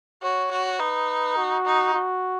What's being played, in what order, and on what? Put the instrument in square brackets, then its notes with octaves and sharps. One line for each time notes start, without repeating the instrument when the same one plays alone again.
[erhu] F#4 [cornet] C#5
[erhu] F#4
[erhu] D#4 [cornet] B4
[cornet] F#4
[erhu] D#4
[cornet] F#4